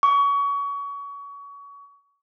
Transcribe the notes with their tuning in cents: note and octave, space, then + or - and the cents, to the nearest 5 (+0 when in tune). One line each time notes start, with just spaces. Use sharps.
C#6 +30